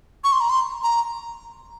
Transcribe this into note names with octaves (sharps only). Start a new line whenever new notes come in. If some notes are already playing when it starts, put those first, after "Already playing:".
C#6
C6
A#5
C6
A#5